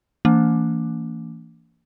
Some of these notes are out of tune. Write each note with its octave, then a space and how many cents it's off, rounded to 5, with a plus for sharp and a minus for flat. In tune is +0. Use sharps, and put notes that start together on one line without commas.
E3 +0 A#3 -35 D4 -45